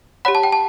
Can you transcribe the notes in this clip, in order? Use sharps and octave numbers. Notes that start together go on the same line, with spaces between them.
G4 C#5 F#5 B5
A5
G5
A5